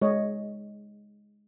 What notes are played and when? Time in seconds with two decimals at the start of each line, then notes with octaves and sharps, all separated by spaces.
0.02 G#3 C#5 D#5